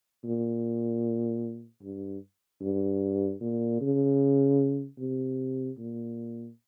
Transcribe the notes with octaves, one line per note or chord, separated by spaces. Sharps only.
A#2
G2
G2
A#2
C#3
C3
A#2